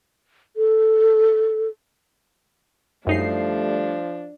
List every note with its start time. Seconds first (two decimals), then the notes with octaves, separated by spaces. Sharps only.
0.56 A4
3.07 F#2 F3 G3 A3 D4 D#4 C7